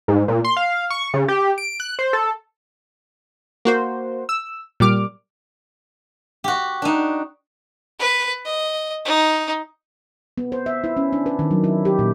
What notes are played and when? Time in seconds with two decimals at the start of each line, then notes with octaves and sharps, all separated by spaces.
0.08 G#2
0.28 A#2
0.45 C6
0.57 F5
0.90 C#6
1.14 C#3
1.28 G4
1.58 D7
1.80 F#6
1.99 C5
2.13 A4
3.65 A#3 F#4 C5
4.29 E6
4.80 A#2 G3 D6 F6
6.44 F#4 G4
6.82 D4 D#4
8.00 B4
8.45 D#5
9.05 D#4
10.38 B3
10.52 C5
10.66 E5
10.84 E4
10.97 C#4
11.13 D4
11.26 B4
11.39 D#3
11.51 F#3
11.64 E4
11.85 G4
11.99 A#2